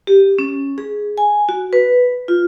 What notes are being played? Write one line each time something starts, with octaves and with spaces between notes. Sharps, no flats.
G4
C#4
G#4
G#5
F#4
B4
F4